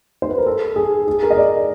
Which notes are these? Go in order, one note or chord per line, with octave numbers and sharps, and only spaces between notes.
C5
B4
A#4
A4
G#4
G#4
A#4
D#5
D5